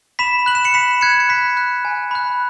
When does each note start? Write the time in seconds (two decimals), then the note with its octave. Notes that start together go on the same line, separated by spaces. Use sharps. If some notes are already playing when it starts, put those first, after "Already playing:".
0.19 B5 B6 E7
0.46 F#6 F#7
0.55 E7
0.64 C#7 F#7
0.74 B5 B6 E7
1.01 F#6 G#6 C#7
1.20 C#7
1.29 B5 B6
1.57 F#6
1.85 G#5
2.11 B5 F#6